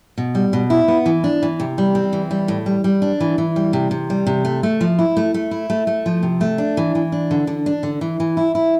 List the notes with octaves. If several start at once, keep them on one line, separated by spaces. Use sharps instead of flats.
B2
G3
B2
E4
B3
E3
D4
E3
C3
G3
C4
E3
G3
A2
G3
G3
D4
E3
E3
G3
C3
C3
G3
C3
A3
A3
F3
E4
A3
A3
E4
A3
A3
F3
C3
A3
D4
E3
E3
D4
D3
D3
D4
D3
E3
E3
E4
E4